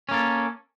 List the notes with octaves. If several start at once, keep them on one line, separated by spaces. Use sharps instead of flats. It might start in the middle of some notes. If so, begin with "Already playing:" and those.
A#3 C#4 A4